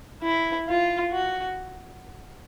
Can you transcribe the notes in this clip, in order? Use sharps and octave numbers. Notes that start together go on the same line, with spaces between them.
E4
F4
F#4